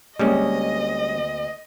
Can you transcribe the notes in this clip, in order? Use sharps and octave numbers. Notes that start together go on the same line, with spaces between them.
D2 G3 G#3 A#3 C4 C#4 D#5